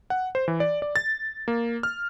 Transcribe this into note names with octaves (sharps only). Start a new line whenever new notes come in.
F#5
C5
E3
D5
D5
A6
A#3
F6